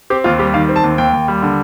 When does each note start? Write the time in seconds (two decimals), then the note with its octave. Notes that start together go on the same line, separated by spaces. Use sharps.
0.10 C4 G4
0.24 D#2 F4
0.39 G3 G4
0.54 D#3 F5
0.69 C4
0.76 A5
0.84 D#2
0.98 D#2 G5
1.13 D#2
1.28 G3
1.42 D3